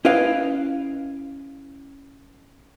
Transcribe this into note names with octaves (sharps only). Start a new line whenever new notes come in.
C#4 E4 B4 D#5 F5 G5